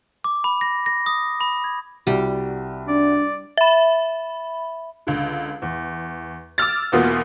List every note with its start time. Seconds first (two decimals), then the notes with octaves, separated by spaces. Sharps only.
0.24 D6
0.44 B5
0.61 A#6
0.86 A#6
1.06 D#6
1.41 B5
1.64 G#6
2.07 C2 G3 F#4
2.88 D4 D5
3.57 E5 B5
5.07 C#2 D3
5.62 E2
6.58 D6 E6 F6 A6
6.92 E2 B2 A#3 B3 F4 D#6